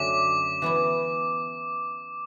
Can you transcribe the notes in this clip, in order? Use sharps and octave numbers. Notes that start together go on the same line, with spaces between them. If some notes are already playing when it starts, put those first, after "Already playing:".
Already playing: F#2 D3 F#3 A3 C#4 D6
E3 B3 E4